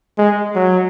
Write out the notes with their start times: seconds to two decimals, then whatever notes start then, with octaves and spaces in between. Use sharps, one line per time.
0.18 G#3
0.55 F#3